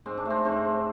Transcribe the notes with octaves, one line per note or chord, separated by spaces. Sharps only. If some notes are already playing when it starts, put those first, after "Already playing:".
G#2 C4
D4
A3 C4
G#2 C4
G#2